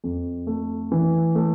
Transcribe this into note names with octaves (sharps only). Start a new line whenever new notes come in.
F2
A3
E3
A3